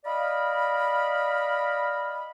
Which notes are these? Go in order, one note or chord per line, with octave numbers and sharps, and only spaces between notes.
D5 D#5 F5 B5